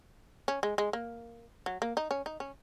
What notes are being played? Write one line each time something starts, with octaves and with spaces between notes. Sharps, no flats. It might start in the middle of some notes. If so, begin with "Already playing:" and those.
C#4
G#3
G#3
A#3
F#3
A#3
D#4
C#4
D#4
C#4